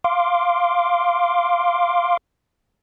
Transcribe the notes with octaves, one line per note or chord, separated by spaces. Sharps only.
F5 C6 D6